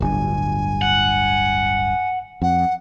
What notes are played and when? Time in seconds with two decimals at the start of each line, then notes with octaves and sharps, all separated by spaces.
0.01 D1 G1 G2 G#5
0.82 F#5
2.42 F2 F#5